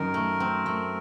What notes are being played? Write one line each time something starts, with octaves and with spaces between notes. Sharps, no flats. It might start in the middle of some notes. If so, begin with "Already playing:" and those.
Already playing: F#2 D#3 A#4
A3
C4
A3